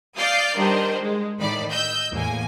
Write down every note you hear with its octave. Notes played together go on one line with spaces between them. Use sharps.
D5 F5 D#6 F6 G6 C7
D#3 G3 D4 C5 D#5
G#3
A2 D#3 D5 B5
D#5 E6 G6
E2 A2 A#3 G#5